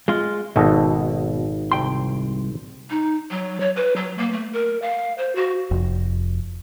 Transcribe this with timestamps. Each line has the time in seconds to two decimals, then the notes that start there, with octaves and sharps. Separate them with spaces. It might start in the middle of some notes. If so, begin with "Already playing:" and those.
0.08 G#3 F4
0.56 G#1 B2 A4 D#5
1.72 C2 G5 C6
2.90 D#4
3.31 F#3
3.60 C#5
3.76 B4
3.96 F#3
4.18 A#3
4.33 A3
4.53 A#4
4.82 F5
5.18 C5
5.36 F#4
5.71 F1 F2